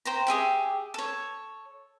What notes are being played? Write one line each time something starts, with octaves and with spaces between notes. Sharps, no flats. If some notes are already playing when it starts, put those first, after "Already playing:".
C5 G5 A#5
G4 G#4 E5 G5
A4 C#5